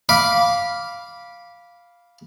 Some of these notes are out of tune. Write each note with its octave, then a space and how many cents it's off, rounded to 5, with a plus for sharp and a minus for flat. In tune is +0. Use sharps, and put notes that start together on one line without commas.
F5 +0 B5 -10 D6 -10